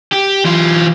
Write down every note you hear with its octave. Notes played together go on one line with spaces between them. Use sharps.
G4
E3 F4